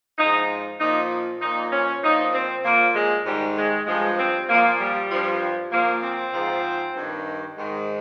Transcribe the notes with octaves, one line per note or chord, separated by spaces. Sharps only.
G#2 F3 D#4
A#2 F3 D#4
A#2 F3 D#4
C#4
A#2 F3 D#4
C4
A#2 F3 A#3
G#3
G#2 G3
D#3
G#3
G2 F3 G#3
C4
A#2 F3 A#3
G3
G2 F3
A#2 F3 A#3
C4
G#2 F3
G2 D#3
G#2 D#3